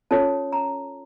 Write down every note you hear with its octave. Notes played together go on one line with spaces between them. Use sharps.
C#4 F4 A4 C#5 A5
A#5